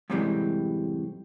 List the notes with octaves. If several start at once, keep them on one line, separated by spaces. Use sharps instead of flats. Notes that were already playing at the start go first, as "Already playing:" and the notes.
F#2 A2 C3 E3 G3 G#3